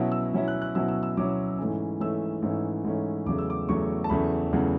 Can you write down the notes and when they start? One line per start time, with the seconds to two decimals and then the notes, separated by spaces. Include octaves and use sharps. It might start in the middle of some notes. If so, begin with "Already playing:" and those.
Already playing: B2 F#3 C#4 E4
0.12 E6
0.34 B2 F#3 C#4 E4
0.48 F#6
0.62 F#6
0.75 B2 F#3 C#4 E4 E6
0.88 E6
1.03 E6
1.17 B2 F#3 C#4 E4 D6
1.59 G#2 E3 A3 C#4
2.00 G#2 E3 A3 C#4 E6
2.42 G#2 E3 A3 C#4
2.84 G#2 E3 A3 C#4
3.26 E2 C#3 F#3 A3 D6
3.38 E6
3.50 D6
3.68 E2 C#3 F#3 A3 C#6
4.04 A5
4.10 E2 C#3 F#3 A3 B5
4.52 E2 C#3 F#3 A3